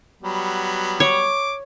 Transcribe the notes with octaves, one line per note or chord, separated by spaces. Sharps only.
F#3 G3 B3
C#5 D6